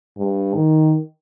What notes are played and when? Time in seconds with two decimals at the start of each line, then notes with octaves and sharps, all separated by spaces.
0.17 G2
0.55 D#3